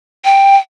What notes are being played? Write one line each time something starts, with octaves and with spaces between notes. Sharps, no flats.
G5